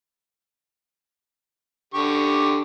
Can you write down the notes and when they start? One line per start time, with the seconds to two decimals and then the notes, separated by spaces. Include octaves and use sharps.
1.94 D3 G4 C#6